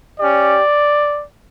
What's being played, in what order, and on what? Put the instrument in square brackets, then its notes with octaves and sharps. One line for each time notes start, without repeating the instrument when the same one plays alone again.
[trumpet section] C#4 G4 D5